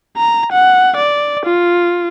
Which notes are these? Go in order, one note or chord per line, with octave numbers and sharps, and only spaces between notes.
A#5
F#5
D5
F4